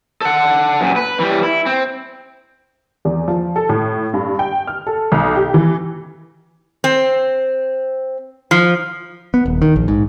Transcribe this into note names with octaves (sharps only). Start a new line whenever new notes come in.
A4 F#5
F#2 A#2
B4
E3 G3
E4
C4
E2
F3
A4
A2
G2
G5
F6
A4
B1
G4
E3
C4
F3
B3
D#1
D#3
A#1
G#2